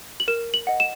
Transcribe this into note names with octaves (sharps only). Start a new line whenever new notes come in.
F#7
A#4 E7
F#7
D#5 F#5
E7